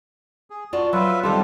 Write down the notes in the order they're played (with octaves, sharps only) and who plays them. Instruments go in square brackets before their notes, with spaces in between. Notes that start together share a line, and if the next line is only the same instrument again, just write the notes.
[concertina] G#4
[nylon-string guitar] F4 D5 A5 [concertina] F#4
[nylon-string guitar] F#3 [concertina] F4 B4 E5
[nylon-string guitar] D#3 G3 A4 [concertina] C4 D4 F4